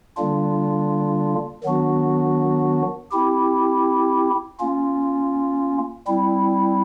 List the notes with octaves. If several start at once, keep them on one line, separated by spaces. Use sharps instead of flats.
D3 G3 A#3 D4 F4
D#3 F#3 B3 D4 F#4
C4 E4 G4
A#3 C#4 F4
G3 C4 E4